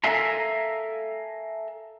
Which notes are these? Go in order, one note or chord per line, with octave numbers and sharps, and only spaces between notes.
A4 A#4 E5 F5 G#5 A#5